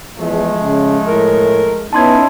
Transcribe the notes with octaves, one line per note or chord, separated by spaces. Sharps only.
E2 F3 G#3 A3
C#3
A2 A#4
B3 C#4 D#4 E4 A5 C6 G#6